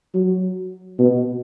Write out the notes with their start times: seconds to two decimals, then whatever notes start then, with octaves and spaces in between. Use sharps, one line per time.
0.14 F#3
0.99 B2